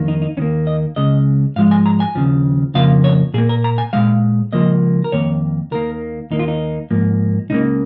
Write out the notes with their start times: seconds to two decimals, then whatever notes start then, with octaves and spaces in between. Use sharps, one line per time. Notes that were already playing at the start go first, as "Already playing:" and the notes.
Already playing: F2 D#3 A#3
0.08 D#4
0.22 D#4
0.37 D#2 D#3 A#3 C#4
0.67 D#5
0.96 C#2 C#3 G#3 D#5
1.56 G#2 F3 G#3 F5
1.71 G#5
1.86 A#5
2.00 G#5
2.15 D#2 C#3 F3
2.74 F2 C#3 F3 A#3 F5
3.04 C#5
3.34 A#2 G#4
3.38 A#3
3.49 A#4
3.64 A#5
3.78 G#5
3.93 A#2 F3 G#3 F5
4.53 C#2 C#3 F3 A#3 D#5
5.04 A#4
5.12 F2 D#3 A#3 C#5
5.71 D#2 D#3 A#3 A#4
6.31 D#2 D#3 A#3 D#4
6.39 F4
6.48 D#4
6.90 G#2 F3 A#3
7.50 C#2 C#3 A#3 D#4